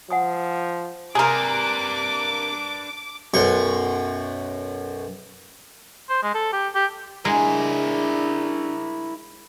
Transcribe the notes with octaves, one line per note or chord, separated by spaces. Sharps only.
F3 F#5 G#5 D#6
C3 A#3 D4 G#4 A#4 B4 D6
B1 F#2 C6 C#6
C5
G#3
A4
G4
G4
G#3 D4 E4 A#4